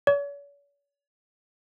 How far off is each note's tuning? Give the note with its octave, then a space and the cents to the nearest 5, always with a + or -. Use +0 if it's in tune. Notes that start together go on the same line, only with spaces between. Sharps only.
C#5 +45